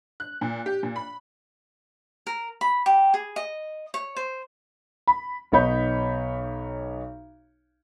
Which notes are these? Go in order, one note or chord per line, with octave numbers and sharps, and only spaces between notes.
F#6
A#2
G4
A#2
B5
A#4
B5
G4
G#4
D#5
C#5
C5
B5
B1 B3 D#4 C#5 B5 G6